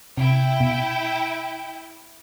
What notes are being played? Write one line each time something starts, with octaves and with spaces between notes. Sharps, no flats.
C3 E4 G5
B2